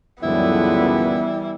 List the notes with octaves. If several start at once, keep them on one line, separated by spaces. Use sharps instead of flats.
C#2 F#2 D3 E3 G3 B3 E4